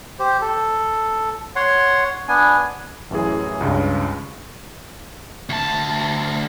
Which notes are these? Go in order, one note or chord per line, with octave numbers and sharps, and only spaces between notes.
G4 C5
A4
C#5 F#5 C6
B3 D4 G#5
A1 F#2 E3 G#4
C#2 G2 C#3 G#3
D2 A5